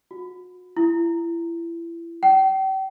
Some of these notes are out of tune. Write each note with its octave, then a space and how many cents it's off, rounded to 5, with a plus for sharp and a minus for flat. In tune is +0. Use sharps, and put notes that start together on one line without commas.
F#4 -35
E4 +30
G5 -40